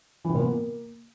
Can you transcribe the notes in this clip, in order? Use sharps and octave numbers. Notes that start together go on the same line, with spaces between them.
E3
C3
A#2
B3
A#3